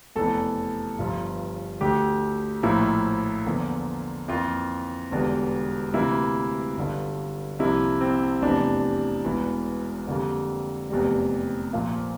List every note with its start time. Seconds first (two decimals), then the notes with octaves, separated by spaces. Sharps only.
0.16 F1 E2 E3 A4
0.99 G1 G2 F3
1.81 D2 D3 A3 G4
2.63 A#1 A2 F3 A#3 E4
3.46 E2 D3 F3 A#3
4.28 F2 E3 A#3 F4
5.11 E1 E2 D3 G3
5.93 D2 C3 E3 A#3 E4
6.77 G1 G2 D3
7.59 C2 C3 F3 A#3 E4
8.01 C4
8.41 F1 E2 C3 E3 D4
9.25 E1 E2 E3
10.07 F2 D3 G3 A#3
10.90 F1 E2 C3 G3
11.73 A#1 A#2 F3 A#3